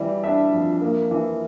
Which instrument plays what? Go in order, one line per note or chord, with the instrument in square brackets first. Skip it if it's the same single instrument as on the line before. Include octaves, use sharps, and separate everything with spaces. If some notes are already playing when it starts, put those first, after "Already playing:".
Already playing: [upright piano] E3 G3
D4 E5
F2
A#3
E3